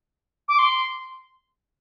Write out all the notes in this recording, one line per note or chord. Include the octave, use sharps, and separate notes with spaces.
D6
C6